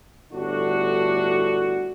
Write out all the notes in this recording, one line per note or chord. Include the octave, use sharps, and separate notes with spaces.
G1 A2 D4 F#4